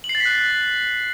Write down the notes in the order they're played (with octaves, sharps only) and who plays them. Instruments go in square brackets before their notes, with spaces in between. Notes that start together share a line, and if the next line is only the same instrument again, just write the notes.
[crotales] F#7
C7
A6
B6
F#6